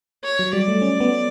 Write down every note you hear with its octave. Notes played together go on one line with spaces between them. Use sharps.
C#5
F#3
G3 D5
A3
C#4
B3